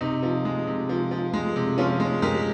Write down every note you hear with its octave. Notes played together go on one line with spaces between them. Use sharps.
C3 D#4
F3
G#3
C3
F3
F3
G#3
C3
F3 C#4 F4
G#3
G#3 G4 A#4